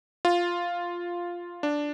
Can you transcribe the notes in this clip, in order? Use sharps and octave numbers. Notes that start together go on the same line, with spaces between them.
F4
D4